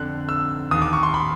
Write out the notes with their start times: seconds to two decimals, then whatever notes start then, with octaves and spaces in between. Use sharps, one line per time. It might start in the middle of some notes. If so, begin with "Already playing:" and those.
Already playing: F2 D3 F#6
0.29 E6
0.71 D#2 D#3 D#6
0.82 D6
0.93 C#6
1.03 C6
1.14 B5